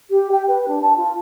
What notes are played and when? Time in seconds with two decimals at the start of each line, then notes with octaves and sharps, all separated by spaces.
0.10 G4
0.31 G5
0.48 B4
0.68 D4
0.82 A5
0.96 F4